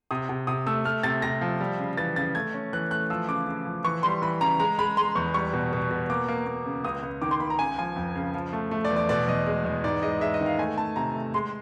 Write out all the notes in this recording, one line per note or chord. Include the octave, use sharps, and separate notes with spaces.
C3 D#6
C3
C3 D#6
A3 E6
A3 F6
C3 A6
C3 A#6
F3
G3
C#3
E3 A6
C#3 A6
A3 G#6
C#4
E3 F#6
A3 F#6
F3 E6
C#3 D6
C#3
F3
E3 C#6
G3 C6
E3 B5
C#3 A#5
G#3 A#5
G#3 B5
G#3 C6
E2 C#6
G3 C#6
B2
B2
B2
A#3 D6
A#3
A#3
C#3
C#2 D#6
C#2
D#3 D6
C6
C#2 B5
A#5
C#3 G#5
F3 G#5
F2
C#3
F3
A3
A3
D5
E2
D5
B2 D5
E2 D#5
G#3
E2
G#2 D5
G#3 D#5
G#3 E5
D#5
D#3
F5
A3 G#5
A3 A5
C3 A#5
A3
G#3 C6